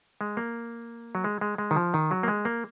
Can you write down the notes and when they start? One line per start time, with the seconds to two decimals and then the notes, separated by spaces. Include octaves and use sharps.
0.21 G#3
0.37 A#3
1.15 F#3
1.24 G#3
1.41 G#3
1.58 G#3
1.71 D#3
1.76 F3
1.94 D#3
2.11 F#3
2.23 A#3
2.28 G#3
2.45 A#3